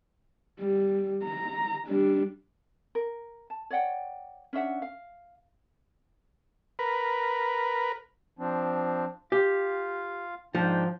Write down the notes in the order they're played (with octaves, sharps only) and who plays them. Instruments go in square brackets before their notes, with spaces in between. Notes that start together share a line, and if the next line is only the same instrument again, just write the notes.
[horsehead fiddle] G3
A#5
G3 D4
[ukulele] A#4
A5
C#5 D5 F#5 G5
C#4 D4 E5 F#5
F5
[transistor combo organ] A#4 B4
[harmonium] F3 C4 D4
[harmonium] F4 F5 [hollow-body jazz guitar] G4
[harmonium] G#2 D4 G5 [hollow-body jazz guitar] F3